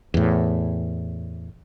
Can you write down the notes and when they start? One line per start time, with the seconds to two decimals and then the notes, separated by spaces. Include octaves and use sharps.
0.14 E2 A2